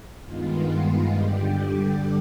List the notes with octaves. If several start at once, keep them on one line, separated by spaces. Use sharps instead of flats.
G2 D#3 G#3 B3 F4
G2 D3 G3 G4